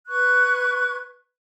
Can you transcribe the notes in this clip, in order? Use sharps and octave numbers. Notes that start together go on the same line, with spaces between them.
B4 C#6 F#6 G#6